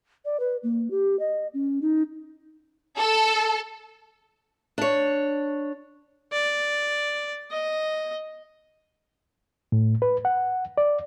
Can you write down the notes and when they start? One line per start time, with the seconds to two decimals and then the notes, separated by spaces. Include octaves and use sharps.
0.25 D5
0.40 B4
0.63 A#3
0.91 G4
1.19 D#5
1.54 C#4
1.82 D#4
2.98 A4
4.78 D4 C#5
6.32 D5
7.51 D#5
9.72 A2
10.02 B4
10.25 F#5
10.78 D5